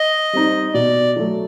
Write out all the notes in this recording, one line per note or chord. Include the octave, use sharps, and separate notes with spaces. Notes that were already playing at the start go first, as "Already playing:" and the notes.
Already playing: D#5
G3 C4 D#4
B2 D5
F#3 A3